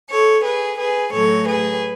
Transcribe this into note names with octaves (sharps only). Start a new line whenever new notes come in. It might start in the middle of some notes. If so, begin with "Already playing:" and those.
A4 C#5
G#4 B4
G#4 B4
A2 F#3 A3 A4 C#5
G#4 B4